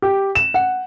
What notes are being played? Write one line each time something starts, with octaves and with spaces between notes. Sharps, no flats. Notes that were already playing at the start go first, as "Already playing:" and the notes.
G4
E7
F#5